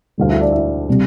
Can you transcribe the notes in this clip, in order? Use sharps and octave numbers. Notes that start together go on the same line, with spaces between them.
D2 D3 G3 F5
E4 E5
D4 D5
E4 E5
C3 G3